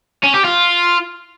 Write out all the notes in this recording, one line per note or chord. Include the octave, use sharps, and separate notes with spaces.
C#4
G4
F4